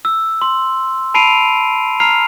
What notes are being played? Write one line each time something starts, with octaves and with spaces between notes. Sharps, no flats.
E6
C6
A5 B5 C7 D7 D#7 F7
A#5 F6 C7 F7